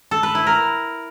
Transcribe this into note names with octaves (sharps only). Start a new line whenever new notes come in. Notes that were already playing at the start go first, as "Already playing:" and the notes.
A4
B4
E4
A#4